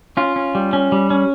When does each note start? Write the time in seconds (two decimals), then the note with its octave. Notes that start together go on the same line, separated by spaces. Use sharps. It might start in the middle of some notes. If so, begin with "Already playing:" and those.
0.17 C#4 F4
0.36 C#4
0.55 G3
0.73 C#4
0.92 G3
1.10 C#4